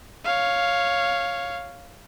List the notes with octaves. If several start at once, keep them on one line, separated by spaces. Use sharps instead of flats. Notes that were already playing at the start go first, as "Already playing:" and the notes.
C#5 F5